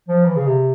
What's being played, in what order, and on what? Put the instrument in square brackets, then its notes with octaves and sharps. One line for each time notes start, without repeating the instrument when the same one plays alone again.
[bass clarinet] F3
E3
C#3
C3